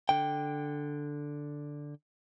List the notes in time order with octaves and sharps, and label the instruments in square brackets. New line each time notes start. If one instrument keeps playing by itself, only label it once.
[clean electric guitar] D3 G5